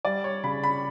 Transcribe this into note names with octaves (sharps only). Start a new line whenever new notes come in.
G3 D5
C#5
C#3 B5
B5